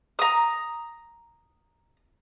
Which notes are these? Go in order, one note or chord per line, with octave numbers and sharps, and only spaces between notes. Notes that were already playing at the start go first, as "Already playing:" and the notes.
A#5 D#6